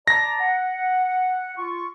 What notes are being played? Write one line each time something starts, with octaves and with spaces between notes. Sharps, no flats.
D5 A5 A#5 A#6
F#5
F4 C#6